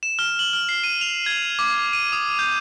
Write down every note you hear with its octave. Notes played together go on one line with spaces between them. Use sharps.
E7
F6
F#7
F6
C7
D#7
F7
G#6
D6
D#7
D#6
G6